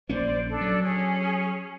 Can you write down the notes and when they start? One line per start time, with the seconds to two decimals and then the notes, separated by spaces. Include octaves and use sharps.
0.09 A#1 A#3 C#4 C5 D5
0.48 D4 A4
0.61 F#3
0.83 C#4 G#4